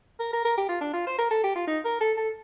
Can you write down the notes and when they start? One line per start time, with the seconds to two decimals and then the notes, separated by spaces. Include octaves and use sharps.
0.19 A#4
0.33 A#4
0.45 A#4
0.57 G4
0.69 F4
0.81 D4
0.93 F4
1.07 C5
1.18 A#4
1.31 A4
1.43 G4
1.56 F4
1.67 D#4
1.84 A#4
2.00 A4
2.17 A4